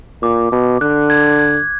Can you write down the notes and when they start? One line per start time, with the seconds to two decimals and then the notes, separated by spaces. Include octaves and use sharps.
0.22 A#2 D6
0.52 B2
0.81 D3 F#6
1.10 G#6
1.39 G#6